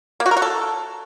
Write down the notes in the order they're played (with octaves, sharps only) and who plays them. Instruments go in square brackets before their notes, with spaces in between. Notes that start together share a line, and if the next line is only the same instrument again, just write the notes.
[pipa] A#3
F#4
A#4
F#4
A4